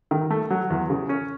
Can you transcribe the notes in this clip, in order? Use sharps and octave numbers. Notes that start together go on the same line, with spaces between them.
D#3
A3
F#3
E2
C#3
C#4